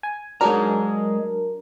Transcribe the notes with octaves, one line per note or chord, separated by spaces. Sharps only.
G#5
F#3 G#3 D4 G#4 A#4 A#5